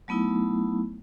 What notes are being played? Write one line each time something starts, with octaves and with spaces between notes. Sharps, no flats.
F#3 A3 B3 D#4 E4